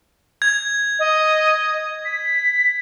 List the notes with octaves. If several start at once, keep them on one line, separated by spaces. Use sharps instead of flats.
G#6
D#5
B6